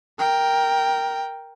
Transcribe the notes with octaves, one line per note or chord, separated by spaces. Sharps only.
A#4 G5